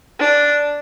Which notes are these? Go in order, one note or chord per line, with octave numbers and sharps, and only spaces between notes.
D4